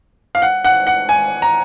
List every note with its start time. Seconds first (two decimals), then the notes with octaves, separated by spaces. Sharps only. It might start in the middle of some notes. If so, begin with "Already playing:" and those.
0.35 F5
0.42 F#5
0.64 F#5
0.87 F#5
1.09 G#5
1.42 A#5